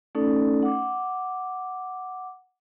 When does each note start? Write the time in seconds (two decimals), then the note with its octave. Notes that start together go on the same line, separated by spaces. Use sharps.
0.15 A3 C#4 D#4 A4 D5
0.63 F#5 D6